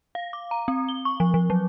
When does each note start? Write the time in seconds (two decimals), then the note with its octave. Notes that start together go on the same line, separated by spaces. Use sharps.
0.15 F5
0.33 D6
0.51 A#5
0.68 C4
0.89 G7
1.05 C#6
1.20 F3
1.34 F3
1.50 F#3